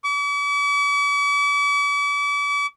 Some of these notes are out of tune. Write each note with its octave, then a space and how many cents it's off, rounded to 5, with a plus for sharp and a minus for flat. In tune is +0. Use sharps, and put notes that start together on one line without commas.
D6 -45